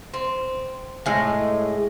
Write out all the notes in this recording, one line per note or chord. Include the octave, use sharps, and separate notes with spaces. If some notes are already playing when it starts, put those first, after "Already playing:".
C4
A2 G#3